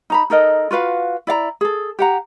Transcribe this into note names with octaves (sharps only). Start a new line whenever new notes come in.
D#4 A#5 B5
D#4 A4 A#4 D#5
F4 F#4 B4 F5
E4 D5 F5 A#5
G#4 A4
G4 F#5 A#5